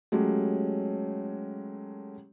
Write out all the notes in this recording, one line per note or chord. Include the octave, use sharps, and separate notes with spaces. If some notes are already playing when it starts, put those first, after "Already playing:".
F#3 G#3 A3 C#4 G4